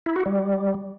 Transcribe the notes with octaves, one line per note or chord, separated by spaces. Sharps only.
E4
F#4
G3